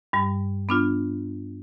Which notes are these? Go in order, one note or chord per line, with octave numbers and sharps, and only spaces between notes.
G2 G3
B3 D4 F4